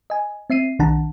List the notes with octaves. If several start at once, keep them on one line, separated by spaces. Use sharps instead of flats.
D#5 G#5
C4 E5 C7 D#7
B1 D#3 D4 F#5 A5 A#5